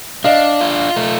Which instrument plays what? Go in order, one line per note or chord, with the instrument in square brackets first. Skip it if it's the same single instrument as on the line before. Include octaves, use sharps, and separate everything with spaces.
[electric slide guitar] D4 [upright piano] D#5 F5
[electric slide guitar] F4
A3